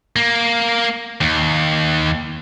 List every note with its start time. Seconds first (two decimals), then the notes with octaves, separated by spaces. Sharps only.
0.16 A#3
1.21 D#2